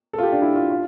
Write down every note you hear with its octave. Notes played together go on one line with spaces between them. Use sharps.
A4
F4
G4
D4
E4
F4
F4